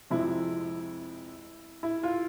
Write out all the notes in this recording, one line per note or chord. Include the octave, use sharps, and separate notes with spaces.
F2 C3 F3 G#3 C4 E4
E4
F4